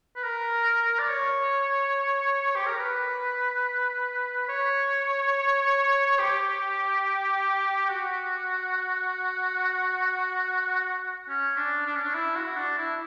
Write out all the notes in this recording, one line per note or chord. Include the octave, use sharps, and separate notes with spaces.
B4
A#4
D5
C#5
G4
A#4
B4
C#5
G4
F#4
C#4
D4
D4
C#4
D4
E4
F#4
D4
E4